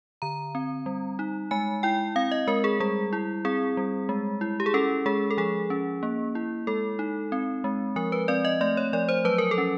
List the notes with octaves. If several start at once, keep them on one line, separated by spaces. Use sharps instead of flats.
D3 A#5
C4
G3
D#4
G#3 G#5
E4 G5
C4 F5
D#5
G#3 A#4
G#4
G3 G#4
E4
C4 G#4
G3
G#3
E4
G4
G#4
C#4 A4
G#3 G#4
A4
F3 G#4
C#4
A#3
E4
G#3 A4
D#4
C4
G#3
F3 A#4
B4
C4 D5
D#5
A3 D5
C#5
F3 D5
C5
F#3 B4
A#4
A4
C#4